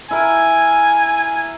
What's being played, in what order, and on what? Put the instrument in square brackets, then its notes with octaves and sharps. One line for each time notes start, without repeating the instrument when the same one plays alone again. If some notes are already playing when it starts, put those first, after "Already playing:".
[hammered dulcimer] E4 A#4 [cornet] G#5